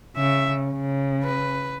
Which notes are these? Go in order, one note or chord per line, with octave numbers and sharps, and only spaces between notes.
C#3 E5
C#3
B4